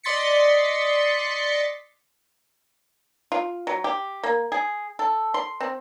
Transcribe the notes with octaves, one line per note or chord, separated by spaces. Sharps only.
D5 D#5 C6 A6 B6 C#7
F4
F#3
G4
A#3
G#4
A4
C6
C4